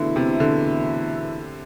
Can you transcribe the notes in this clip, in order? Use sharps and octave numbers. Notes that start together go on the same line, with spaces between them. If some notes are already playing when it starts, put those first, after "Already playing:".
Already playing: E2 B2 D3 A3 E4
C3
D3